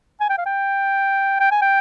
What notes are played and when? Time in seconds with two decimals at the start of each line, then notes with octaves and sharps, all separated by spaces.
0.20 G#5
0.29 G5
0.38 F5
0.46 G5
1.40 G5
1.51 G#5
1.62 G5